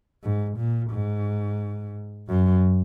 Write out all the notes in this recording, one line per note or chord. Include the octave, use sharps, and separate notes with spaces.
G#2
A#2
G#2
F#2